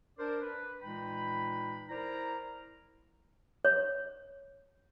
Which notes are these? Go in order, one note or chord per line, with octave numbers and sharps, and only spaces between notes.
D4 A#4 C5 D5
B4
A#2 E3 G#3 D#4 G5 B5
E4 A#4 C5 D5 A#5
C#5